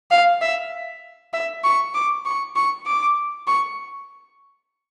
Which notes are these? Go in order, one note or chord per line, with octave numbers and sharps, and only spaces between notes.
F5
E5
E5
C#6
D6
C#6
C#6
D6
C#6